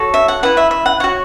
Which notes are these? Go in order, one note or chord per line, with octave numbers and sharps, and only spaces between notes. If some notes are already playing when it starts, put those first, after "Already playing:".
Already playing: F#4 A4 C#5
E5
F#5
E4 B4 F#5
E5
E5
F#5
F#4 C#5 F#5